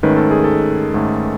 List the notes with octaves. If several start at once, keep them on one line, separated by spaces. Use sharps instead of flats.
G#2 D#3 A3 C#4 B4
A4
G#4
A4
G#2 D#3 A3 C#4